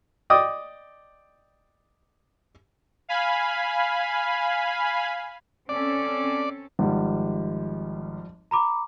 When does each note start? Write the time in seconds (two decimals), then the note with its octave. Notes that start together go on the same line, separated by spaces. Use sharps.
0.30 D5 D#5 G5 D6 D#6
3.09 F5 G#5 B5
5.69 C4 C#4 A4 D5
6.79 G#1 F3 G3
8.51 A#5 B5 D6